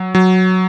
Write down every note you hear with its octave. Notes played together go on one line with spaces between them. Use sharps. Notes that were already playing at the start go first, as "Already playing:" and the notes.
Already playing: F#3
F#3